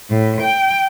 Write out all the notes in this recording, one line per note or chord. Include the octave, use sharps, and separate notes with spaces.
A2
G5